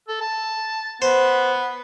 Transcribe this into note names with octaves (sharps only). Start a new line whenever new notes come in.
A4
A5
B3 C5